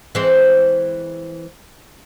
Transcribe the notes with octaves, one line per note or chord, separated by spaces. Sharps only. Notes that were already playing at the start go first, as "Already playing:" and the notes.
E3 G#3 C4